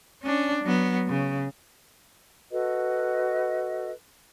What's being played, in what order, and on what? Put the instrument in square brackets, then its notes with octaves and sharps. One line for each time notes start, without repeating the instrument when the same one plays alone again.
[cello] C#4 D4
F#3 B3
C#3
[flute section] F#4 A4 B4 D#5